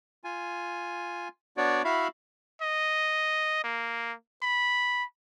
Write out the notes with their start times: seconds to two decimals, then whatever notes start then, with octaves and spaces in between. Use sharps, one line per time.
0.24 F4 G#5
1.57 B3 D4 F#4 C#5 D5
1.84 E4 F#4 E5 F5 B5
2.62 D#5
3.64 A#3
4.43 B5